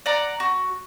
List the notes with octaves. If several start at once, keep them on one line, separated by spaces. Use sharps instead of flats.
D5 F#5 A#5
F#4